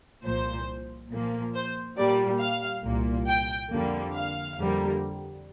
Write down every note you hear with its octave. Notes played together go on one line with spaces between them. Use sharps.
C2 A#2 F3 C5
A#2 F3 A#3
C5
A#2 G3 A#3 D5
F5
C2 A#2 A#3
G5
F2 D3 G3 A#3
F5
F2 D3 G3 A#3